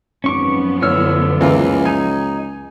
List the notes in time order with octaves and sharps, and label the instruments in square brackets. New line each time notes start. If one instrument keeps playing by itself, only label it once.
[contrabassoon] G#1 [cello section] F#2 F3 B3 [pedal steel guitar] C#4 C#6 D6
[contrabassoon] A2 [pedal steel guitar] D3 E6 F6 [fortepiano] C#5
[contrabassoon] C#2 [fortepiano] E3 A#3 F4
[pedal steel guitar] D#4 [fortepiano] G#5